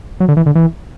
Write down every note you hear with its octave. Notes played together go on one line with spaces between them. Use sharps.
F#3
D3
E3
D3
E3